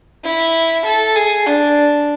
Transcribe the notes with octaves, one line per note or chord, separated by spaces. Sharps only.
E4
A4
G#4
D4